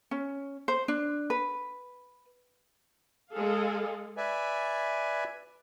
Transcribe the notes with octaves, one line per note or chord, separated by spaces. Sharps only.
C#4
C5
D4
B4
G#3 G#4 A4 F5
B4 D5 E5 G#5